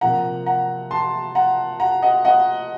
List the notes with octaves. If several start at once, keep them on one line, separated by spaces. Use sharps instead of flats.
C3 F3 A#3 F#5 A#5
F#5 A#5
A5 C6
F#5 A#5
F#5 A#5
D#5 F#5
D#5 F#5